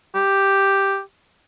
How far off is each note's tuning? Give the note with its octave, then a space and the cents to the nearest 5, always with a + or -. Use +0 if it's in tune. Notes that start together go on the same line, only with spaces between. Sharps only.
G4 +0